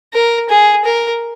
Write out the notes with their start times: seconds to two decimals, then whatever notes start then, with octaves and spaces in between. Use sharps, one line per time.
0.14 A#4
0.50 G#4
0.85 A#4